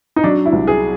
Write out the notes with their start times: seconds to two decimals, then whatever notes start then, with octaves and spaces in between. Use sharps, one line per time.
0.16 D#4
0.24 F#3 D4
0.46 E4
0.53 C2
0.67 G#4